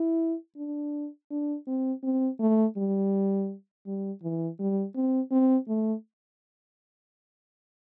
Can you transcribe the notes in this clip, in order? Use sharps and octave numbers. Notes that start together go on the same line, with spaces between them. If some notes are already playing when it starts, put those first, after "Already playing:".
Already playing: E4
D4
D4
C4
C4
A3
G3
G3
E3
G3
C4
C4
A3